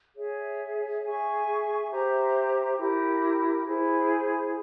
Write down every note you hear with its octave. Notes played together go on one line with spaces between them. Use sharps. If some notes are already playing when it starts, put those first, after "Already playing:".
G#4 C#5 E5
G#4 E5 G#5 C#6
G4 C5 E5 A#5
E4 G4 A#4
E4 G#4 C5